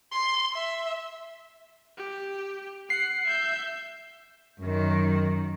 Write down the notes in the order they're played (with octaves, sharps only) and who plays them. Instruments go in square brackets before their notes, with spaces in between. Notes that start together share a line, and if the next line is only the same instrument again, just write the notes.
[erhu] C6
E5
[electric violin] G4
[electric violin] F#5 [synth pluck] C7
[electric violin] E5 G6
[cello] F#2 D#3